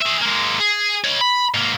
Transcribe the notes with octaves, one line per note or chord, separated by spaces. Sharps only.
G#4 E5
G#3 A#3
G#4
C#5 D#5
B5
G#2 A#3